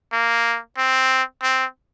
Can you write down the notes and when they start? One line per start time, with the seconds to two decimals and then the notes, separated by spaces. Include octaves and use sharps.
0.13 A#3
0.77 C4
1.42 C4